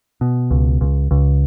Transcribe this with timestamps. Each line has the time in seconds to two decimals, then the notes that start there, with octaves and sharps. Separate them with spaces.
0.21 B2
0.51 C#2
0.81 C#2
1.11 C#2